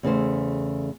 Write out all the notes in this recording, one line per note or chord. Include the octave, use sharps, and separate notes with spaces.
E2 C#3 A3 C5